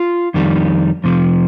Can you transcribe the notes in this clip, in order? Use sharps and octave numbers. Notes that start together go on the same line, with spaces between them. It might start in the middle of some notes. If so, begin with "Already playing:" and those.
Already playing: F4
F2 D#3 G3
F2 C3 F3